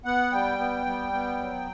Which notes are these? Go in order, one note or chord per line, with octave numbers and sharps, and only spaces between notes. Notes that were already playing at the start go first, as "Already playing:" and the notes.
B3 F#5
G3 G5
B3
G3
B3
F#3